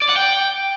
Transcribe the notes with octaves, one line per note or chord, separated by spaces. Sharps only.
D5
F#5
G5